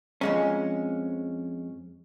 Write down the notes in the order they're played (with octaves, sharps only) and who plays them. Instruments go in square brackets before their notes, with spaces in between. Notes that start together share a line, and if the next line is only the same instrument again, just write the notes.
[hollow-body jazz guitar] F2 G#3 C#4